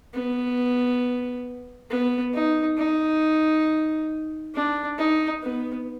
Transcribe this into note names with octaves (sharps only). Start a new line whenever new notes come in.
B3
B3
D#4
D#4
D4
D#4
B3